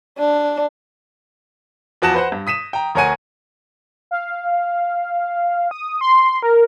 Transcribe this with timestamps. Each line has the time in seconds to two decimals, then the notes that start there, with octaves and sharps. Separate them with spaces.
0.19 D4
2.02 E2 F3 F#4 A5 A#6 E7
2.14 B4 C5 F#5
2.32 G2
2.47 D#6 B6 D#7 E7
2.73 G5 A#5
2.95 D2 A#4 C#5 F#5 G#5 D#7
4.11 F5
5.71 D#6
6.01 C6
6.42 A#4